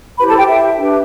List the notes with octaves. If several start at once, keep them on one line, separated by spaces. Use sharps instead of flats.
E4 G4 B4 C5 B5
A4 A5
G4 G5
E5
D4 G4 B4